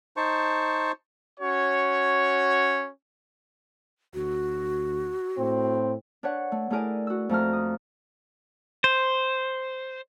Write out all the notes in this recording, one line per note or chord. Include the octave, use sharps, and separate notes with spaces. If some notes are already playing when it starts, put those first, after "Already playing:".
D#4 C5 A5 C#6
C#4 F#4 C#5
D2 F#4
A2 C4
D4 B4 C#5 F#5
A3
A3 E4 G#4 A#4 D5 G#5
F#4 E6
F2 A3 A#5 F6
D#6
C5